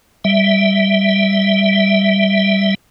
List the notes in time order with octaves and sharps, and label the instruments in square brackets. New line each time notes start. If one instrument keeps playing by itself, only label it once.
[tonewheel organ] G3 E5